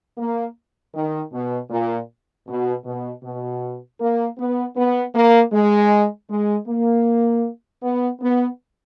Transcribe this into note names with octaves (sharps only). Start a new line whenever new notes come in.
A#3
D#3
B2
A#2
B2
B2
B2
A#3
B3
B3
A#3
G#3
G#3
A#3
B3
B3